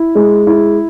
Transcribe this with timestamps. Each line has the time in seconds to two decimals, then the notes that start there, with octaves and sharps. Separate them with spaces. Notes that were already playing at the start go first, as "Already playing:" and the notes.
Already playing: E4
0.15 G#3
0.47 E4